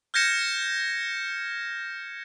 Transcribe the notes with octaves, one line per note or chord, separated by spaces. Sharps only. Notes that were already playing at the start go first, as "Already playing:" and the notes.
F6 G6 G#6 A#6 C#7 E7